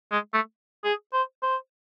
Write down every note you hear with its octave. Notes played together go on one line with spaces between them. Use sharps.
G#3
A3
G#4
C5
C5